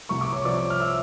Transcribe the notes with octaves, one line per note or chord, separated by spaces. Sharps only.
C2 C#6
D6
C#5 C#6
C3 F3 D5 D6
F6
E5 E6